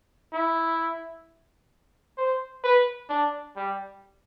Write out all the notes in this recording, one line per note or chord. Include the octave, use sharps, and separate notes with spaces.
E4
C5
B4
D4
G3